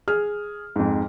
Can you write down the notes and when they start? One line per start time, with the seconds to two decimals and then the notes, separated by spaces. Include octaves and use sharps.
0.08 G#4 F6
0.76 F2 G#2